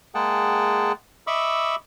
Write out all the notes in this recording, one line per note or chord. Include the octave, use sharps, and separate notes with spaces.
G#3 A#3 G#4 F#5 G5 A5
D#5 E5 B5 C#6 D6 E6